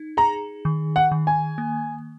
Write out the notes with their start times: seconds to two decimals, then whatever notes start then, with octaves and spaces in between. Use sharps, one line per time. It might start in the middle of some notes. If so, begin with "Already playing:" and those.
Already playing: D#4
0.17 G#4 A#5
0.65 D#3
0.96 F#5
1.12 D#3
1.27 G#5
1.58 A#3